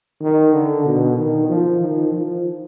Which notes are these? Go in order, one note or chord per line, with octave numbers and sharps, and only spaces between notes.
D#3
D3
B2
D#3
F3
D#3
F3